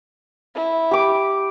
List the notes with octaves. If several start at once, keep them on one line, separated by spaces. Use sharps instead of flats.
E4
G4 B5 D6